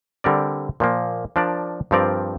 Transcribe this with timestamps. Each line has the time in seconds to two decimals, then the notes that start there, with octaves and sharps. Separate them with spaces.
0.24 D3 G3 C4 A#4 D5
0.80 A#2 F3 A#3
1.36 F3 D4 A#4 D5
1.91 G2 F3 C4 A#4 D5